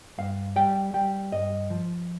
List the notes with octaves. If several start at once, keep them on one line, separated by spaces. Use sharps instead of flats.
G2 F5
G3 G5
G3 G5
G2 D#5
F3